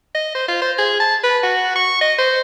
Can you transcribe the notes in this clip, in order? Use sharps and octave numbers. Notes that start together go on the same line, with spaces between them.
D#5
C5
F4
C5
G#4
A5
B4
F#4
C#6
D#5
C5